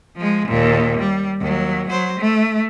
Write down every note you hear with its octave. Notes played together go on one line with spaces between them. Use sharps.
F3 G#3
D#2 A#2
G3
D#2 F#3
F#3 C5
A3